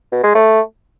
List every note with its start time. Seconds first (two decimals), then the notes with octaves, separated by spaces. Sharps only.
0.12 B2
0.24 G#3
0.35 A3